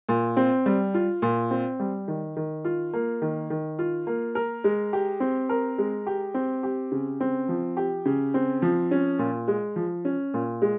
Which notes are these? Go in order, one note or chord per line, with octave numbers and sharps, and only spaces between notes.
A#2
C4
G3
F4
A#2
C4
G3
D#3
D#3
F4
A#3
D#3
D#3
F4
A#3
A#4
G#3
G4
C4
A#4
G#3
G4
C4
G4
C#3
C4
F3
G4
C#3
C4
F3
C#4
A#2
G#3
F3
C#4
A#2
G#3